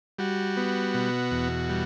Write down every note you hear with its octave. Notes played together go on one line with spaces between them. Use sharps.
G3 F#4
B3
B2
E2
G3